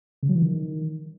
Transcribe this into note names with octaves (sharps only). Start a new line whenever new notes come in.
C#3
F#3
E3
D#3